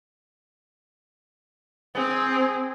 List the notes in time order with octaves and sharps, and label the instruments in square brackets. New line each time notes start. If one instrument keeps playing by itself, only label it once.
[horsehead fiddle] C4 G#4